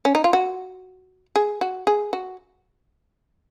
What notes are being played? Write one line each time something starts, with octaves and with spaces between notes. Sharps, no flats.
C#4
D#4
F4
F#4
G#4
F#4
G#4
F#4